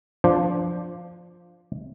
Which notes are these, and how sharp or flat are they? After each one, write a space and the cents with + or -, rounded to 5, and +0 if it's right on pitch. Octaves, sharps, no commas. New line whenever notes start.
F3 +0 D4 +0 C5 +5